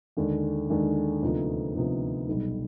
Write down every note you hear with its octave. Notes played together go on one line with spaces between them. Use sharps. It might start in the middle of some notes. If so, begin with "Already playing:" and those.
D#2 D3 G#3
D#2 D3 G#3
D2 C3 F3 B3 D#4
D2 C3 F3 B3 D#4
B1 B2 G3